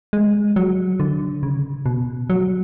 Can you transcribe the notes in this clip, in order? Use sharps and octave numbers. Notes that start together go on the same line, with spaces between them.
G#3
F#3
D3
C#3
B2
F#3